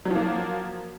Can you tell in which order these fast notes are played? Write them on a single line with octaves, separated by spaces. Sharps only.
F#3 F3 A#3